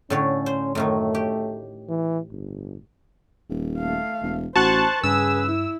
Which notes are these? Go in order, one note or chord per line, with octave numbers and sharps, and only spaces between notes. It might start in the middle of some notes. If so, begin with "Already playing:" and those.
A2 D3 C#4 C#5
C5
F#2 A2 D#3 A3
G4
E3
G1
D#1
A3 F5
E1
A1 F#4 C5 A5 C#6 F#6
G2 C#3 G#4 B4 E6
E4